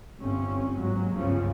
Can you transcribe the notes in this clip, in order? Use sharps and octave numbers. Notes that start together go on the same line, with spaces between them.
G1 C4 C#4
G#2 F#3 G#3 A#3
G1 C#2 C#3 F3 C#4